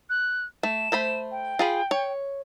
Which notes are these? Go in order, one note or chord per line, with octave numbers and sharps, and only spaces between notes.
F#6
A3 E7
A3 C5 B5
G5
F4 G#4 B5
C#5